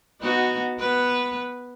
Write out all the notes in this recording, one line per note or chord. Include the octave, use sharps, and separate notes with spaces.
B3 D#4 F#4
B3 B4